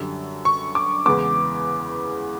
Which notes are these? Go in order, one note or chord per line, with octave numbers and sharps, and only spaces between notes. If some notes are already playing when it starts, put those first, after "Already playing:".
Already playing: F#2 D3 G3
C#6
D6
E2 C#3 E3 G#3 B3 D6